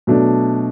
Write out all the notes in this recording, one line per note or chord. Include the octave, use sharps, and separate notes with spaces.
B2 F#3 A3 D4